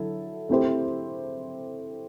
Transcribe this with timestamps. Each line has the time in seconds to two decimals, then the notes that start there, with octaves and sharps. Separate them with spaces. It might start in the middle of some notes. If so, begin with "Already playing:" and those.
Already playing: D3 F#3 E4 A4
0.49 A3 C4 E4 G4 C5